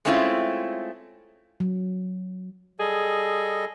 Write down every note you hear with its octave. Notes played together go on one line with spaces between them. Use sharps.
G#3 A3 C4 C#4 E4 F4
F#3
G3 G#4 A4 D#5